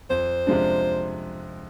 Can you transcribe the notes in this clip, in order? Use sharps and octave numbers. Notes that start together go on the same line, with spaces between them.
F2 C5
C3 F3 G#3 D4